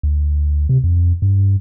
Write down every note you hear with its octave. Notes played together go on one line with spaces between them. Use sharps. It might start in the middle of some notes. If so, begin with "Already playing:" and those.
D2
C3
F2
G2